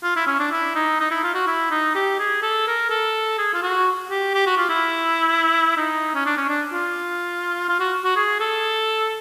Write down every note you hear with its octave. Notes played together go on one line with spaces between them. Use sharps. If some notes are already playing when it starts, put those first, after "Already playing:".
F4
E4
C#4
D4
E4
D#4
D#4
E4
F4
F#4
E4
D#4
G4
G#4
A4
A#4
A4
G#4
F4
F#4
G4
G4
F#4
F4
E4
D#4
C#4
D4
C#4
D4
F4
F4
F#4
F#4
G#4
A4